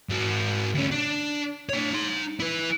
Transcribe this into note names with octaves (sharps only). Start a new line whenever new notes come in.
G#2 F#4
D2 C#4
D4
D4 C#5
D#4 C6
E4 B4